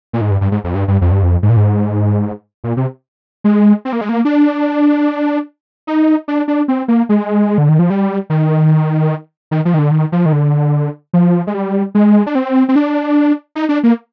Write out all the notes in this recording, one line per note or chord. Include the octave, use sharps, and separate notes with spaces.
A#2
G#2
G2
G2
G#2
F2
G2
G2
F2
G2
F2
G#2
A#2
G#2
A#2
C3
G#3
C4
A#3
G#3
A#3
D4
D#4
D4
D4
C4
A#3
G#3
D3
D#3
F3
G3
D#3
D#3
F3
D#3
D3
D#3
F3
D#3
D3
F3
G#3
G3
G#3
D4
C4
C4
D4
D#4
D4
A#3